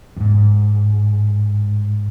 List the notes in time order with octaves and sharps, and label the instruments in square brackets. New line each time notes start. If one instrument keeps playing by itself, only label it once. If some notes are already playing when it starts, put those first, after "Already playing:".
[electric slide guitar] F2 G#2